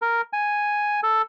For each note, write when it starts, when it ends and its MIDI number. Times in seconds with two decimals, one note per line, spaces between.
0.02 0.21 70
0.33 1.00 80
1.03 1.22 69